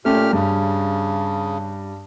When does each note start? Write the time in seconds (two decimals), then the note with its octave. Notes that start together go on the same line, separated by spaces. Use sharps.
0.05 A#2 A3 C#4 G4 F6
0.33 G2 C#3